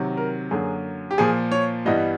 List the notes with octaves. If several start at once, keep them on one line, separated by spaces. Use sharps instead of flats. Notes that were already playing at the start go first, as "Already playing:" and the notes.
Already playing: C3 D#3 F#3
A#4
F#2 D3 F#3 A#3 G#4
G4
A#2 F3 A#3 G#4
C#5
G2 E3 G3 B3 D#5